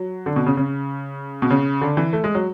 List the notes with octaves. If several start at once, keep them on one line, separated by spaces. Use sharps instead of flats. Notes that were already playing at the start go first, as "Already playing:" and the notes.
Already playing: F#3
D3
B2
C#3
C#3
B2
C#3
D3
E3
A3
G#3
F#3